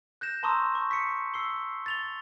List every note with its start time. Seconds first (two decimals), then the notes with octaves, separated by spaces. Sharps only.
0.21 F#6 G6 A#6 E7
0.43 A5 A#5 C6 C#6 D#6 E6
0.75 C#6
0.91 B6 C#7
1.34 E6 C7 G7
1.86 A6 F7 G7